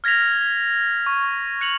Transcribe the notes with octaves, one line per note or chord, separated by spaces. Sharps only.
F6 G#6 A#6 B6 F7
C#6
F#6 C#7 F7 F#7